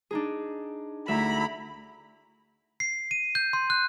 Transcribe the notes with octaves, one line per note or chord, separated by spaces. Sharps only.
D4 D#4 G#4
D2 E4 E5 A#5 B5
C7
D#7
G6
C6
F#6